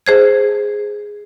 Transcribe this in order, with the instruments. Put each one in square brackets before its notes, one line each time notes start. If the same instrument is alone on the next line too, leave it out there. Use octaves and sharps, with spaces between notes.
[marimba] G#4 C5 G#6